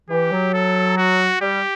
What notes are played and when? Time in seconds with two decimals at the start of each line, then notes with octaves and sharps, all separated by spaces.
0.10 E3 G4
0.32 F#3
0.53 A4
0.98 F#4
1.41 G3 G4